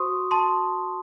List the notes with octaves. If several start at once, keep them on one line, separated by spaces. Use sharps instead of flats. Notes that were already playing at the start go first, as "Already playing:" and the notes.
Already playing: F#4 C5 C6 C#6 D#6
A5 C6